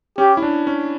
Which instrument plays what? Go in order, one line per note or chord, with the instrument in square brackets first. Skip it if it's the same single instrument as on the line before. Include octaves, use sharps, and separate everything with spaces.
[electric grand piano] C#4 [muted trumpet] G4
[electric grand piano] E4
D4
C#4